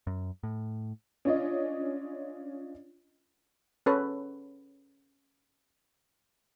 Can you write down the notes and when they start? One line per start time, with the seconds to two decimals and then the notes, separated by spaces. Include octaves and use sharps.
0.07 F#2
0.43 A2
1.25 C#4 D4 F4 C#5 D#5
3.86 C#4 A4 B4 C#5